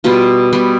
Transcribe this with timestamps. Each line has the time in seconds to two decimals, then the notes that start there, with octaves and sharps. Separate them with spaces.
0.04 B2 G3 B3 F4
0.53 B2 G3 B3